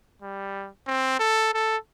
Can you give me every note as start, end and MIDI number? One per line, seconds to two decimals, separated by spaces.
0.22 0.69 55
0.87 1.18 60
1.19 1.52 69
1.54 1.77 69